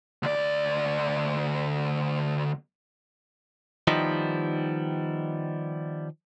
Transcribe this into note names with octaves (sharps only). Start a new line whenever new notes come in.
D2 D5
D#3 F3 G3 B3 D#4 E4